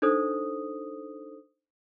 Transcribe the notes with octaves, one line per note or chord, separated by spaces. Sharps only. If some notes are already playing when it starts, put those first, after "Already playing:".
D4 D#4 A4 C5 D#6